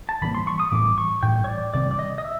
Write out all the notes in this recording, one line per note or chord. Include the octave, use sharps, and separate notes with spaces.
A5
A2 E3 G3 A#3 B5
C6
C#6
D#6
A2 E3 G3 D6
C#6
A2 E3 G3 G5
C#5
D5
C3 D#3 G3 C4 D5
D5
D#5
D#5
E5